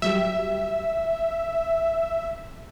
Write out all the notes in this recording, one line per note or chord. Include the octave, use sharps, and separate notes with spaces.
F#3 G3 G4 E5